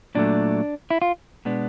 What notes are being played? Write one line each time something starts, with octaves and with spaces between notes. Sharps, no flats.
A#2 F#3 A3 D4
E4
F4
B2 G#3 B3 D4